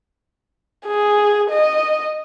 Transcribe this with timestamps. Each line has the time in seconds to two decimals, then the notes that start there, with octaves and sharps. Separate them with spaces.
0.86 G#4
1.50 D#5